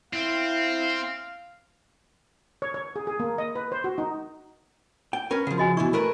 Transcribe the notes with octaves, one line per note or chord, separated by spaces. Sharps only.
C4 E4 F5
C#5
C#5
G#4
G#4
A#3
D#5
B4
C5
F#4
D#4
G5
C#4 A#4 B4
C#3 F3 F#5
F#4 D#5 G#5
B2 E3 E4 C#6
A3 A#4 B4